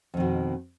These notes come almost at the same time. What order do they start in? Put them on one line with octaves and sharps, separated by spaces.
F2 D#3 B2